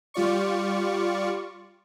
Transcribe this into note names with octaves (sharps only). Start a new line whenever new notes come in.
G3 F4 D5 C#6